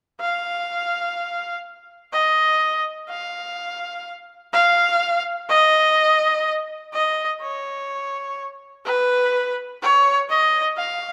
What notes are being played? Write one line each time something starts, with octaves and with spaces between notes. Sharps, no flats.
F5
D#5
F5
F5
D#5
D#5
C#5
B4
C#5
D#5
F5